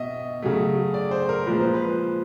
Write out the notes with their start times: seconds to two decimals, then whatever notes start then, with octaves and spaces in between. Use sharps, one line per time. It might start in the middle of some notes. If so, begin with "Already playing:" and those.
Already playing: B2 D#5 E5
0.42 C#3 F#3 A3
0.94 D5
1.11 C5
1.29 A#4
1.46 A#2 F3 G#3 B4
1.60 C5
1.74 B4